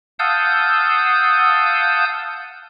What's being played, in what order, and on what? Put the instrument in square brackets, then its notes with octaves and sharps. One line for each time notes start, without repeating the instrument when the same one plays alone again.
[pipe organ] F5 F#5 A5 D#6 E6 G6